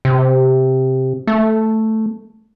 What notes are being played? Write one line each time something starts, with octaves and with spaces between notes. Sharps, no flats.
C3
A3